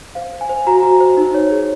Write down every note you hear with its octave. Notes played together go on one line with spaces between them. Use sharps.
C5 F5
C5
G#5
C5
F#4 A#5
F#4
C5
D#4
C#5
G#4